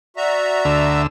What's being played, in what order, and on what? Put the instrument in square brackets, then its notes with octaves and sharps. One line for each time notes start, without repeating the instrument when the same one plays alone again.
[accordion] F#4 E5 A#5 [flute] D5
[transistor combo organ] D2 D3 E6